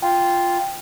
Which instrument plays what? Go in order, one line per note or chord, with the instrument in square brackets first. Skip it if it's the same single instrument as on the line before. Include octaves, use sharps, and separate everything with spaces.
[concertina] F4 [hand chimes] G5